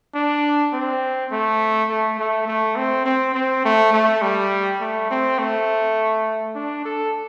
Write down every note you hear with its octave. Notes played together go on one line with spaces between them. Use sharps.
D4
C4
A3
A3
A3
A3
C4
C4
C4
A3
A3
G3
A3
C4
A3
D4
A4